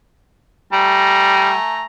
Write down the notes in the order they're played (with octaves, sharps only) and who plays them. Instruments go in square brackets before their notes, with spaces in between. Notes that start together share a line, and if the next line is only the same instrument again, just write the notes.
[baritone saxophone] G3 [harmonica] A3 G#5 A#5